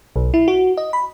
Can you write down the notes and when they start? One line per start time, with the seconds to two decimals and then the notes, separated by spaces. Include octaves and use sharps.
0.16 B1
0.34 E4
0.48 F#4
0.77 D#5
0.93 B5